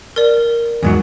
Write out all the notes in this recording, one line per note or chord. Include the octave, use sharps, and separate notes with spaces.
A#4 D5
E2 G#2 F#3